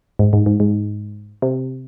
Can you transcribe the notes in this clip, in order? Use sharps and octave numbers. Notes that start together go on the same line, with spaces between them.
G#2
G#2
G#2
G#2
C3